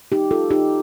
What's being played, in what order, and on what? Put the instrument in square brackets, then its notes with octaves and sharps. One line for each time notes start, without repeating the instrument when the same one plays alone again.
[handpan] D#4 G4
F4 A4
D#4 G4